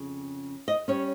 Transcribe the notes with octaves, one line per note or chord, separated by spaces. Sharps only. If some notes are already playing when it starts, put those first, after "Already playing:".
Already playing: F2 C#3 C#4
D#5
G3 C#4 C#5